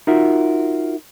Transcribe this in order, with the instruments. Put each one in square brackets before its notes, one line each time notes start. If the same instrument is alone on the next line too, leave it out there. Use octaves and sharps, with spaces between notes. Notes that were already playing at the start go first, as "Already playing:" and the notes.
[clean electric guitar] D#4 F4 F#4 A#4 E5